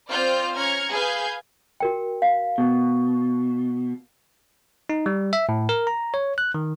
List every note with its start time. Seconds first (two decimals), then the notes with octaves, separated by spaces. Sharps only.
0.10 C4 F4 C5 D5 F6 G6
0.54 C#4 A#5 F6 G#6 C#7
0.91 G#4 B4 F5 G#5 G6
1.80 F#4 A#4 G5
2.22 F5
2.58 B2
4.89 D#4
5.06 G3
5.33 E5
5.49 A2
5.69 A#4
5.87 A#5
6.14 C#5
6.38 F#6
6.54 D#3